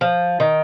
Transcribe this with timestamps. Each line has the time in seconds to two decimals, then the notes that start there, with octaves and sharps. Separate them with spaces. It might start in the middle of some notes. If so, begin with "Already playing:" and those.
0.01 F3
0.40 D#3